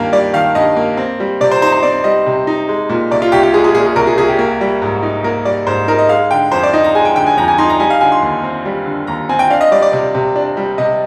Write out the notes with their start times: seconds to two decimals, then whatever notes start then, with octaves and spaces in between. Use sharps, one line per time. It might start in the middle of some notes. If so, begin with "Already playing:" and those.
Already playing: G2 D#3 A#3 F5 G5
0.12 G3 D5
0.33 D#3 F5
0.55 G2 D#5
0.77 A#3
0.97 C4
1.20 G3
1.41 C3 D5
1.52 C5
1.62 D#4 C5
1.72 C5
1.83 C4 D5
2.04 G3 D#5
2.26 C3
2.47 D#4
2.69 G#3
2.89 A#2
3.11 C2 D5
3.22 F4
3.32 C2 G4
3.43 G4
3.54 G#3 G#4
3.64 G#4
3.75 A#2 G#4
3.86 G#4
3.96 C2 A#4
4.07 G#4
4.18 C2 G#4
4.28 G4
4.39 A#3
4.61 G3
4.82 G#2
5.03 D#4
5.24 A#3 A#4
5.45 G3 D5
5.67 G#2 C5
5.88 D#4 A#4
5.98 D#5
6.09 G#3 F5
6.31 D3 G5
6.52 F2 C5
6.63 D5
6.73 D#4 D#5
6.84 A#5
6.95 G#3 G#5
7.05 G5
7.16 D3 G5
7.27 G#5
7.37 F2 A#5
7.48 G#5
7.58 D#4 C6
7.70 A#5
7.80 G3 G#5
7.90 F5
8.01 D3 G#5
8.12 C6
8.22 D#2
8.43 C4
8.65 G3
8.86 D3
9.07 D#2 A#5
9.29 C4 G#5
9.39 G5
9.50 D4 F5
9.61 D#5
9.71 G3 D5
9.82 D5
9.93 C3
10.15 C3
10.36 D4
10.57 G3
10.78 C3 D#5